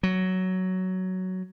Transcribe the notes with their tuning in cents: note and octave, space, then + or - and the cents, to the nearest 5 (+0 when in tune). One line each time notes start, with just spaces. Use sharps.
F#3 +10